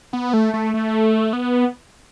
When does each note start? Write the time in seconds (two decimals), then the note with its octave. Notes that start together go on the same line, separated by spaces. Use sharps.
0.13 B3
0.33 A3
0.54 A3
0.74 A3
1.33 B3